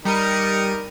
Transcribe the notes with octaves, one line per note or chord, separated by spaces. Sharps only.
G3 D#4 A#4 C#7 D#7